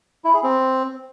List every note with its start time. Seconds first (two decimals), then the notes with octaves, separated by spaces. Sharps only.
0.24 E4
0.34 G#4
0.43 C4